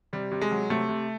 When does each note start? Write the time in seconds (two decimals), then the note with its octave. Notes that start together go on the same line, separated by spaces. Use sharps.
0.13 C3 G3
0.32 C3
0.41 G#3
0.51 F#3
0.70 C3 A3
0.89 C3